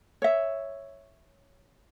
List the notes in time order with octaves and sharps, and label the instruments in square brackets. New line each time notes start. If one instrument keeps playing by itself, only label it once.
[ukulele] C#5 E5